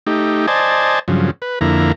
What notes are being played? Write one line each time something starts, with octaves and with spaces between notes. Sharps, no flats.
A3 D#4 G4
C5 D5 D#5 G#5 A5
G2 C#3 F3 F#3
B4
F2 D3 A#3 E4 A#5